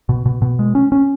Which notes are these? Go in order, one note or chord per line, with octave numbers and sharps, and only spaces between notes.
B2
B2
B2
G#3
C#4
C#4